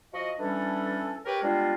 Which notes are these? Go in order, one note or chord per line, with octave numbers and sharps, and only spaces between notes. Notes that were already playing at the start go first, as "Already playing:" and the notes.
F3 F#4 D#5
E3 G3 C#4 D4 A4
G4 A#4 B4 C#5 G5
G3 G#3 B3 D4 F4